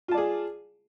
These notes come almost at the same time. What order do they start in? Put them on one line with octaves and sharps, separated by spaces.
F4 A5 D5 G#4